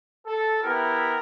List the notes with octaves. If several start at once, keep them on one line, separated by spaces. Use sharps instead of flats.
A4
B3 E4 G4 A#4